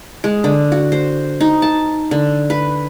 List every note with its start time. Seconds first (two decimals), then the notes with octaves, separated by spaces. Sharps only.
0.24 G#3
0.44 D3
0.72 F#4
0.92 C5
1.41 D#4
1.62 A5
2.11 D3
2.50 B4